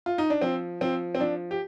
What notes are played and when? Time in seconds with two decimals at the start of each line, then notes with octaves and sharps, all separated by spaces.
0.06 F4
0.18 D#4
0.30 D4
0.41 F3 C4
0.81 F3 C4
1.15 C4
1.20 F3 D4
1.51 G4